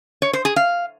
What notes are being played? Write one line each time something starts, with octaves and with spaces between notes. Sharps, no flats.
C#5
C5
G#4
F5